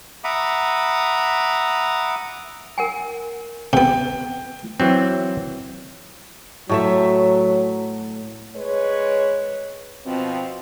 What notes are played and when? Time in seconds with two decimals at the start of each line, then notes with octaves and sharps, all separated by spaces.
0.24 E5 F#5 A#5 B5 D6 D#6
2.78 A#4 F#5 G#5
3.73 C3 B3 G5
4.80 E3 F#3 C4
6.69 A2 F#3 A3 E5
8.55 G#3 B4 C#5
10.05 B2 F3 C4